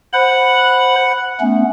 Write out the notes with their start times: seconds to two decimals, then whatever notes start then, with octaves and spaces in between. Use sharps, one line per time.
0.13 C5 F#5 B5
1.40 A3 B3 C#4